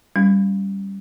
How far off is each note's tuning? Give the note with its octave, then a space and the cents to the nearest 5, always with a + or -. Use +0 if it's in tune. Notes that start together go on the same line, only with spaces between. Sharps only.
G3 +0 C#4 +0